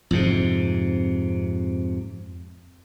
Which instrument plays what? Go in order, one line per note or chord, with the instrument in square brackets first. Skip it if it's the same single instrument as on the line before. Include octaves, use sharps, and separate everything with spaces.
[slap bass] F2 G#2 C3